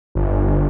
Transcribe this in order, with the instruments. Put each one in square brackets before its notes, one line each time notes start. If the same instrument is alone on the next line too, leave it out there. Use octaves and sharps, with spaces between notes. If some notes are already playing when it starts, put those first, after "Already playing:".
[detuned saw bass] G1